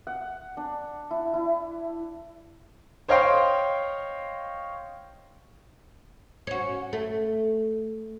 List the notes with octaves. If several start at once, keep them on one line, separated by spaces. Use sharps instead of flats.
F#5
D4
E4
E4
C5 C#5 D#5 F5 G5 C6
C#4 F#4
A3